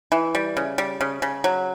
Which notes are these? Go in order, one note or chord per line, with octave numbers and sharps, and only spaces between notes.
E3
G3
C#3
G3
C#3
C#3
F#3